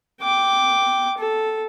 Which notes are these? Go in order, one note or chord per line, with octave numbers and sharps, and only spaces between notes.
G5 D6
A4